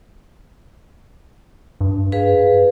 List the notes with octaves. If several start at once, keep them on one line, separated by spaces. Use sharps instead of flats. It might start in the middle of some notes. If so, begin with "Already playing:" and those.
G2
G#4 B4 F5